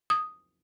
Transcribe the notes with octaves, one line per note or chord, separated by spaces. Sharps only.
D#6